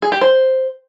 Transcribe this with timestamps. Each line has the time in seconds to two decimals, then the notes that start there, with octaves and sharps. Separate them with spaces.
0.02 G#4
0.12 G4
0.21 C5